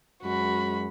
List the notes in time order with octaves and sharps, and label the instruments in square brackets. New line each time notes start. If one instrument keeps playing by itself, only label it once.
[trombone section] F#2 G#3 [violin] F#4 B5